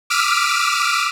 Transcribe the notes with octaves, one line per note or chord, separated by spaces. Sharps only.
D6 E6 F6 B6 D7 D#7